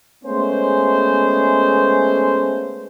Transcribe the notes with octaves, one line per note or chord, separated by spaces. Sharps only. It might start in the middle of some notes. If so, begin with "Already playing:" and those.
G#3 A3 B3 C#4 C5